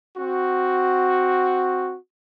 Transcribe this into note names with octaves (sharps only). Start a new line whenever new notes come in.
C4 F#4